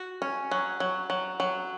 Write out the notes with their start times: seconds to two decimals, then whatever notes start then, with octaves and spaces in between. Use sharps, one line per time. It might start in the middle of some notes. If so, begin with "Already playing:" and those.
Already playing: F#4
0.22 C#4
0.51 F#3
0.80 F#3
1.10 F#3
1.40 F#3